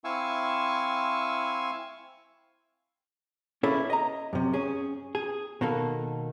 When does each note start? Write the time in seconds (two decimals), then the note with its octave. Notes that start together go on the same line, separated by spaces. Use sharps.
0.04 C4 E4 F5 G#5 C#6 E6
3.63 A#3 C#4 E4 G#4 A4 E5
3.90 D#5 A#5
4.33 F#2 C3
4.53 C#4 G#4
5.15 G#4
5.61 B2 D#3 A#3 D#4 A4